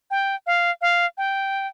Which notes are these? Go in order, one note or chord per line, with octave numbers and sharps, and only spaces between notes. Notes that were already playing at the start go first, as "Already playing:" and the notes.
G5
F5
F5
G5